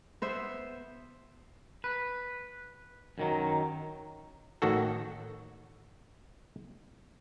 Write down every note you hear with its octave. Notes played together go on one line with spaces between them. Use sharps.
B3 C5 E5
B4
F#2 D#3 F#3
A1 D#3 F#4 A4